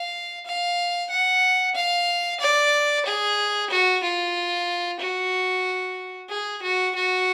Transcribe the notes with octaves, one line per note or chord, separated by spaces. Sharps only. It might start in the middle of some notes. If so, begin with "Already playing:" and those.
Already playing: F5
F5
F#5
F5
D5
G#4
F#4
F4
F#4
G#4
F#4
F#4